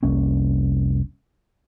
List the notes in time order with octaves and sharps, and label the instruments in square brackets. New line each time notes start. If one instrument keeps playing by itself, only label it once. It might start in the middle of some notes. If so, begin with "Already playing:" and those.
[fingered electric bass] F1 C2 A#3 C#4